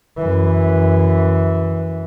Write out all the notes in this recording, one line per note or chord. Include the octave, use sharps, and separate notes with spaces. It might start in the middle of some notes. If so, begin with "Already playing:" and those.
F#2 E3